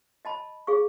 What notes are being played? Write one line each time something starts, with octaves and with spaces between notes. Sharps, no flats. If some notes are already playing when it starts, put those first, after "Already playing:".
D#5 A5 B5
G#4 F5 C#6